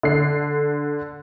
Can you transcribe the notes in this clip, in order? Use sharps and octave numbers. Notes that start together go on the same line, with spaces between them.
D3 C7